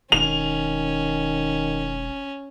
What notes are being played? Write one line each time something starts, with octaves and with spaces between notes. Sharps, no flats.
E1 D#3 C#4 F7